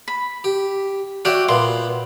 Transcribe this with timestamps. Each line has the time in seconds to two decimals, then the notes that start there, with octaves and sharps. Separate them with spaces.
0.08 B5
0.44 G4
1.25 F#4 C#5 D5 E5 F#5 G5
1.49 A#2 B3 C6